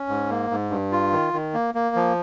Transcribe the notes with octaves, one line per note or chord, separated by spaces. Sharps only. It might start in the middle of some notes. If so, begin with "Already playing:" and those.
Already playing: C#4
G#2
A#3
G#2
G2
F4
D#3
D#3
A#3
A#3
F3